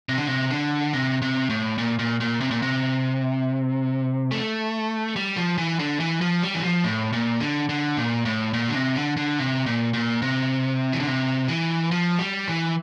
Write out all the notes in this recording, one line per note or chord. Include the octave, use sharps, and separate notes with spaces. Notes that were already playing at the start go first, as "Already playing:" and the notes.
C3
D3
C3
D3
C3
C3
A2
A#2
A#2
A#2
C3
A#2
C3
A3
G3
F3
E3
D3
E3
F3
G3
E3
F3
A2
A#2
D3
D3
A#2
A2
A#2
D3
C3
D3
D3
C3
A#2
A#2
C3
E3
D3
C3
E3
F3
G3
E3